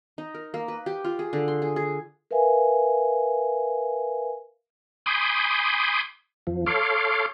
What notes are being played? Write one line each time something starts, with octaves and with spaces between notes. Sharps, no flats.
D#4
A#4
A#3
B4
G4
F4
G#4
D3
C6
G#4
G#4
A#4 B4 E5 F5 G#5
G#5 B5 C6 D6 D#6 G6
F2 F3
A4 C#5 F5 C6 D6